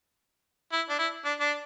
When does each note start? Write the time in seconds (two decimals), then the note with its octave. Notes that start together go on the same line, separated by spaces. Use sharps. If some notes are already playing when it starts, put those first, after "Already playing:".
0.72 E4
0.90 D4
0.99 E4
1.25 D4
1.40 D4